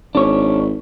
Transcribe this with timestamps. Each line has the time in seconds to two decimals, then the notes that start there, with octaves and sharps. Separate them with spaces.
0.15 G#1 D4 C#5